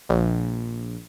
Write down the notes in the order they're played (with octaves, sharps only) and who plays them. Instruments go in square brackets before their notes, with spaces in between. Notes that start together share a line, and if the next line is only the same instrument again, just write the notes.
[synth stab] A#1